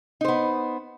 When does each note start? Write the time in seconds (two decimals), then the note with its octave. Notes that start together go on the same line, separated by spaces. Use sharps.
0.21 D#4
0.25 C5
0.28 B3